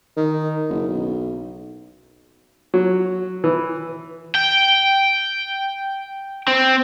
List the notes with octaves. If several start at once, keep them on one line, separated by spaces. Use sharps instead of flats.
D#3
F#1
B1
F#3
E3
G5
C4